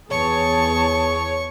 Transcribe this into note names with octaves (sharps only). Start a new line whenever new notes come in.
E2 G#4 C#5 A5 C#6